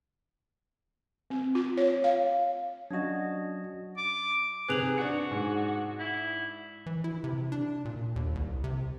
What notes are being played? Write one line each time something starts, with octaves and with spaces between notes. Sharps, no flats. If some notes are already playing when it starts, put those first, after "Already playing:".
C4
F4
C#5
F5
F#3 C#4 D4 F#4 D#5
D6
C3 G#4 B4 F#6 F7 F#7
D4 F#4 C#7
G#2
E4
E3
E4
C3
D4
A#2
D#2
C2
C3